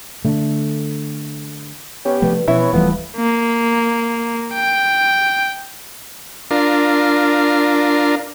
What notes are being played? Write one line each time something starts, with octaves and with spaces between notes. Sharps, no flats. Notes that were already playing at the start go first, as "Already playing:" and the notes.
D3 A3
B3 C#4 G4
G2 C3 F3 A3
B2 E3 F3 B3 C#4 E4 C#5
D1 E3 F3 G3 A3 B3
A#3
G5
D4 F4 A#4